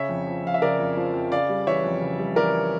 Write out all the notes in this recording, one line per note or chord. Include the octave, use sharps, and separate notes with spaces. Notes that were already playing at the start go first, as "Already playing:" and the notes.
Already playing: C#3 C#5 E5
F2
F3
F2 F5
E5
C#3 A#4 D5
F2
F3
F2
C#3 D5 F5
G3
E3 C#5 E5
F2
C#3
G3
E3 A#4 D5